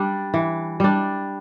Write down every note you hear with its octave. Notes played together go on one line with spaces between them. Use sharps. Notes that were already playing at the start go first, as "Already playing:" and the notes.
Already playing: G3 D4
E3
G3 D4